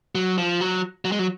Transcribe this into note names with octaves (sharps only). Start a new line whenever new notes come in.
F#3
F3
F#3
F#3
G#3
F#3